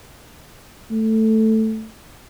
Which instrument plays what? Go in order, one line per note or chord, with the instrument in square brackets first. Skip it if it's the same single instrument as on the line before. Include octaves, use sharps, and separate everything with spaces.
[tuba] A3